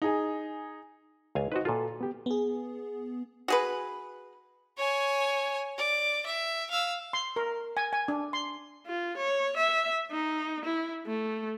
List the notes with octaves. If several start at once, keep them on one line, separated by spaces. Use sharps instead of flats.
D#4 G#4 G#5
C#2 F5 G#5
D#4 F#4 B4 C5 D#5
A#2 F4 F#4 A4 B4
B3 G4
B3 G#4
F#4 G#4 B4
C#5 G#5
D5
E5
F5 E6
C6
A#4
G#5
G#5
D4
C6
F4
C#5
E5
D#4
E4
A3